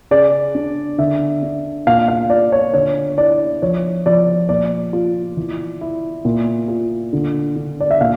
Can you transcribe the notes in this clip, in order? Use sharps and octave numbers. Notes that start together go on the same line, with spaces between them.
C#3 D5
D4
D3 E5
D4
A#2 F5
F5
F4 D5
C#5
D3 C#5
E4 D5
F3 C#5
F3 D5
A#2 D5
F4
E3
E4
A#2
F4
D3
D3
D5
E5
A#2 F5